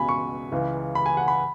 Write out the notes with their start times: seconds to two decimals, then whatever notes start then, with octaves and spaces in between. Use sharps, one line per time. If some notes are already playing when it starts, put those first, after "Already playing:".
Already playing: C#2 B2 G#5 B5
0.09 C#6
0.52 C#2 C#3 E3
0.95 B5
1.06 G#5
1.17 F#5
1.28 B5